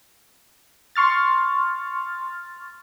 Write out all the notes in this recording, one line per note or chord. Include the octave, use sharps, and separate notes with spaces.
C6 C#6 F6 A6